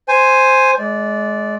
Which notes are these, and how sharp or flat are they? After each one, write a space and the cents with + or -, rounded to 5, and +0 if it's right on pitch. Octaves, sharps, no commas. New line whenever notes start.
C5 +0 G#5 +0
G#3 +25 D5 -15